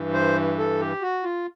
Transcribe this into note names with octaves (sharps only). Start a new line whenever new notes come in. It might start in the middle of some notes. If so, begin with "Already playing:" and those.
Already playing: G2 E3
C5
A4
G4
F#4
F4